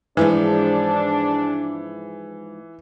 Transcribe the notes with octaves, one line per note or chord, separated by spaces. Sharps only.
G#2 E3 F3 G#3 D4